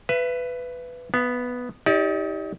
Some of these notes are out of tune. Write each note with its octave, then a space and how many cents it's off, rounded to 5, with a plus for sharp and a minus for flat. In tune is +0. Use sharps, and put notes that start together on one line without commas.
B4 +10 E5 +35
B3 +0 F5 -45
D#4 +35 G4 +0 D5 -15